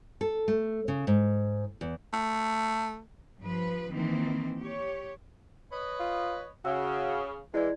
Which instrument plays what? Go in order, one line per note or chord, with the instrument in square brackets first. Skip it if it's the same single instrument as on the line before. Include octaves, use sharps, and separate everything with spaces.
[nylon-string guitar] A4
A3
C#3
G#2
E2
[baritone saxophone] A3
[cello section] G2 F3 B4
D#3 E3 A#3 C4
G4 C#5
[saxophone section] B4 C#5 D#5
[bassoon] F4
[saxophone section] C#3 [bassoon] F#4 [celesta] E6
[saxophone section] E3 [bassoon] G#3 [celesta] E4 D5 G#6